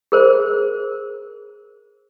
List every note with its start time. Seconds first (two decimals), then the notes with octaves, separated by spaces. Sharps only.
0.12 G#4 A#4 C5